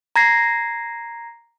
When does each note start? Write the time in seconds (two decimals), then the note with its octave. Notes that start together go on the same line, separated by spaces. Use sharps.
0.16 A#5 G#6 A#6 C7